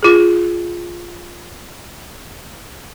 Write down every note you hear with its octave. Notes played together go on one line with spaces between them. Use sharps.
F4 G#4